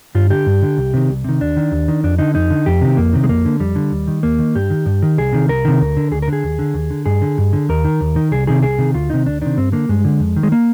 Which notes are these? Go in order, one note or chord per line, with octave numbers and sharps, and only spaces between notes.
G2 F4
D3 G4
G2
D3
C2
C3 D#3
C2
C3 D#3
D#2 D4
D#3
D#2
D#3
F2 D4
D3 D#4
F2 D#4
D3
F2 G4
C3 D#3
F2 A#3
C3 D#3
G#3
F2 A#3
D3
F2 G3
D3
D#2
D#3
D#2 A#3
D#3
G2 G4
D#3
G2
D#3
C2 G#4
C3 D#3
C2 A#4
C3 D#3
D2
D3
D2 G#4
A#4
D3 G#4
D#2
D3
D#2
D3
G2 G#4
D3
G2
D3
D#2 A#4
D#3
D#2
D#3
C2 G#4
C3 D#3 G#4
C2 G#4
C3 D#3
D2 F4
C3 D#3 D#4
D2 D4
C3 D#3 D4
G2 C4
D3 A#3
G2 G#3
D3
F2
D#3
G#3
A#3